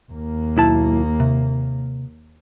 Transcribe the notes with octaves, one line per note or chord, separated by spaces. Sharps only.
D#2 A#3
B1 E4 A5
C3